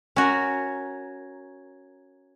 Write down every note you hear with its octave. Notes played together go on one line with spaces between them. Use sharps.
C#4 F#4 A#4